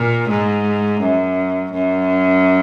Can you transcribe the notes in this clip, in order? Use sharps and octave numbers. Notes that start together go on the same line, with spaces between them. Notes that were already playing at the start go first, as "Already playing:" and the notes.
Already playing: A#2
G#2
F#2
F#2